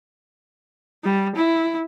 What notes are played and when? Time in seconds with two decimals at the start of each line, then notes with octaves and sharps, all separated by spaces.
1.04 G3
1.36 E4